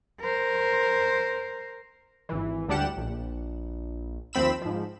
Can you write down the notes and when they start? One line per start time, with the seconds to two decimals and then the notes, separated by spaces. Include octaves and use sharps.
0.21 A#4 C5
2.29 G#1 E3
2.68 D2 G3 D4 G4 F#5 E7
2.97 A#1
4.33 D#2 F3 C4 B5 E6 E7
4.62 G#2 F3